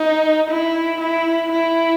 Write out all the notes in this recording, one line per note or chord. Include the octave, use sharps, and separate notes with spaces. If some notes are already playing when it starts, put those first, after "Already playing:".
Already playing: D#4
E4
E4
E4